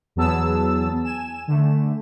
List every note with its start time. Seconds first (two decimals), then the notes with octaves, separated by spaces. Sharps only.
0.16 E2 F#3 B3 G#4 A5 E6
1.05 G#5 E7
1.48 D3 A3